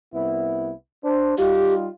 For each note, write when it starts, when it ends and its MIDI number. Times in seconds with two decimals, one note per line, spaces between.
0.13 0.71 36
0.13 0.71 59
0.13 0.71 64
1.03 1.34 62
1.03 1.34 72
1.38 1.87 55
1.38 1.87 63
1.38 1.87 65
1.38 1.74 67